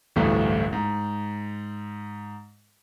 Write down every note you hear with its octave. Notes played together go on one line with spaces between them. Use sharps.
D1 A1 D2 G2 A3
G#2